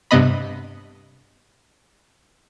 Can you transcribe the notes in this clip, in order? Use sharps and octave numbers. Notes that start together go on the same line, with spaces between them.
G2 C3 B3 D#5 B5